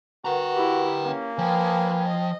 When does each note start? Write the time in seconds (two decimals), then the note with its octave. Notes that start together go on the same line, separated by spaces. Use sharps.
0.25 F#4 A#4 B4 F#5 G5 A#5
0.54 E4 G4
1.05 A#3 C#4
1.38 F3 B4 G5 G#5
2.07 D#5